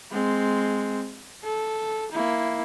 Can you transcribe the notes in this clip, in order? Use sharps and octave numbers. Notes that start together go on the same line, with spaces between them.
G#3 C4
A4
A#3 E4